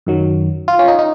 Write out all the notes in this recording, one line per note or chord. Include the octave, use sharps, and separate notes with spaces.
F#2 D#3 F#3
F4
C#4
D#4
D#4